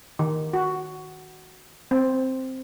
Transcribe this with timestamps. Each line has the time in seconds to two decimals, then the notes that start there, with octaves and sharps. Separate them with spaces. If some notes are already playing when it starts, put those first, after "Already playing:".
0.19 D#3
0.53 F#4
1.91 C4